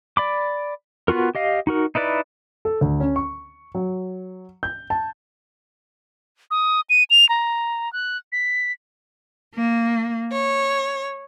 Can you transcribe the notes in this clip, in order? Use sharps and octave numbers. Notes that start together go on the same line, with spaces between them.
D5 B5 D6
B3 F4 F#4 A#4
G4 D#5 F5
D#4 F#4 A#4
D#4 E4 B4 D5
A4
D2
C#4
C#6
F#3
G6
A5
D#6
D#7
F7
A#5
F#6
B6
A#3
C#5